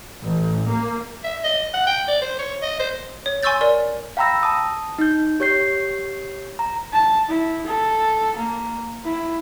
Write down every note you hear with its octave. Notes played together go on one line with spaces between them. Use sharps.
A1
A#3
E5
D#5
F#5
G5
D5
C5
C#5
D#5
C5
C#5
G#5 C6 C#6 E6 G6 A6
A#4 D5
F5 G5 A#5 B5 E6 A#6
A5 D#6
D#4 G6
G4 C#5 G6 C7
A#5
A5
E4
A4
A#3
E4